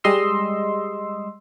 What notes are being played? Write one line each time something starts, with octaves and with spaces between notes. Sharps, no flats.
G3 G#3 D#5 C6 E6